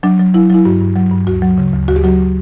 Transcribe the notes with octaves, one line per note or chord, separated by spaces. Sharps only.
F#3 D4
F#3
F#3 E4
F#3 E4
G2 F#4
G2
F#3
G2
D2 F#4
F#3
C#3
D2
D2 F#4
G4
F#3 F#4